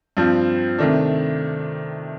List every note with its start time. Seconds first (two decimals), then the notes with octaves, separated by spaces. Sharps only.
0.17 G2 F3 C4
0.78 C3 D#3 A3 D4